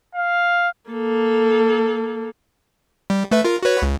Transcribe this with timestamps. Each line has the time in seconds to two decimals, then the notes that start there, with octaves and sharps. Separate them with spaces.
0.15 F5
0.90 A#3 A4
3.10 G3
3.31 A3 B4 E5
3.45 F4 A#4
3.63 F#4 B4 C#5
3.82 C#2